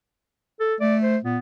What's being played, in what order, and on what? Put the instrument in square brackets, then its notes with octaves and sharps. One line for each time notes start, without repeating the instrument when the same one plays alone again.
[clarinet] A4
[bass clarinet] A3 [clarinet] D5
[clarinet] C5
[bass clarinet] A#2 [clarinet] B3